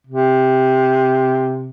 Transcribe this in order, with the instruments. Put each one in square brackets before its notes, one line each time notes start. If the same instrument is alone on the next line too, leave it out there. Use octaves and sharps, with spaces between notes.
[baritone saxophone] C3